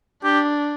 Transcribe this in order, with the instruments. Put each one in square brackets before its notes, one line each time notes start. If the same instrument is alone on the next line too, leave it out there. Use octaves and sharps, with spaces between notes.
[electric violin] D4 [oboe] G4